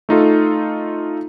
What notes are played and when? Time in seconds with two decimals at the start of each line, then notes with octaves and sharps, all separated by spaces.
0.09 A3 D#4 F4 A4